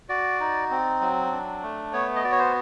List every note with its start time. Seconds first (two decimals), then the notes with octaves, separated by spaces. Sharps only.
0.09 F#4 D5
0.40 D#4
0.70 C4
1.01 F#3
1.32 D4
1.62 A3
1.93 B3 C#5
2.15 D#5
2.24 F#4 D5
2.32 C#5
2.39 C5